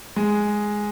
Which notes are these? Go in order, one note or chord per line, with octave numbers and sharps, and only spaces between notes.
G#3